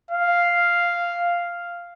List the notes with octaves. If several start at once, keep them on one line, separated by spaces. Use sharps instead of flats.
F5